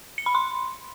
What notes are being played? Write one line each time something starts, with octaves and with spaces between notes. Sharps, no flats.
C#7
B5
C6